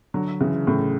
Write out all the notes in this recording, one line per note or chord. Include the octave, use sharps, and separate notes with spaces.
D3 F#3
C#3 E3
A2 C#3